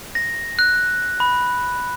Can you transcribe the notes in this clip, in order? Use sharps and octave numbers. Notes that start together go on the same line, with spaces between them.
A#6
F#6
B5